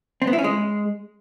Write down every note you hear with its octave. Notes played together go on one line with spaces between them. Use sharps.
C4
B3
E4
C#4
G#3